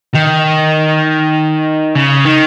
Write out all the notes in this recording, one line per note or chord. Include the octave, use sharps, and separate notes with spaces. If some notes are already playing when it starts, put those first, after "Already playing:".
D#3
C#3
D#3